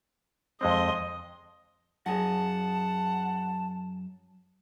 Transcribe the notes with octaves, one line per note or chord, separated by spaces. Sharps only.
F2 G#3 C4 D#5 C6
F#2 G#4 F#5 A5